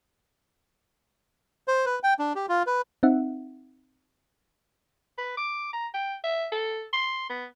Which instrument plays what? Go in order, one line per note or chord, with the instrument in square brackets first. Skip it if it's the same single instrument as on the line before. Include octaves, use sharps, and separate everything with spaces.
[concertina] C5
B4
G5
D4
G4
F4
B4
[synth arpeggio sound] C4 D#4 E5 F#5
[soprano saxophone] B4
D6
A#5
G5
E5
A4
C6
B3